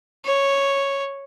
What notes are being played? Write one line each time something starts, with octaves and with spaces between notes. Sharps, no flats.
C#5